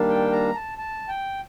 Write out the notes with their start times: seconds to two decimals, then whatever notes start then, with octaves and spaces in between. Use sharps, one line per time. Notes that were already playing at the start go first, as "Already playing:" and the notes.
Already playing: D#3 G3 A#3 D4
0.09 G5
0.32 A#5
0.55 A5
0.78 A5
1.09 G5